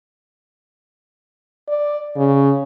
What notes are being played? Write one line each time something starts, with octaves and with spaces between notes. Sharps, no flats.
D5
C#3